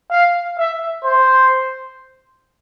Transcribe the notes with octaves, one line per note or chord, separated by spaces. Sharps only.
F5
E5
C5